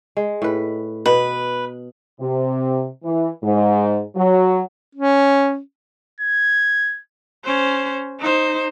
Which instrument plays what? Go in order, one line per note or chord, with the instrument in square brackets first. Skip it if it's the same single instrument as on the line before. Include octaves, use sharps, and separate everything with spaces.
[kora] G#3
A2 B4
[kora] B2 [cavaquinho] B4
[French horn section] C3
E3
G#2
F#3
[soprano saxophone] C#4
[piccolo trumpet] G#6
[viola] C#4 C5
D#4 C5